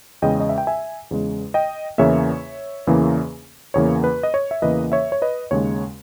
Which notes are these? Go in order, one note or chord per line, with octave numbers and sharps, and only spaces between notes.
E2 C#3 G#3 D#5 G5
D#5
E5
G5
E5 G#5
E2 C#3 G#3
D#5 G5
E2 C#3 E3 A#3 C#5 E5
E2 C#3 E3 A#3
E2 C#3 E3 A#3 C#5
B4
D#5
C#5
E5
E2 C#3 E3 A#3 B4 D#5
C#5 E5
C#5
B4 D#5
D#2 C#3 G#3 C#5